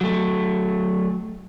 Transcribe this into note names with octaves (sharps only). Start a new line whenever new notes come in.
F#3 A3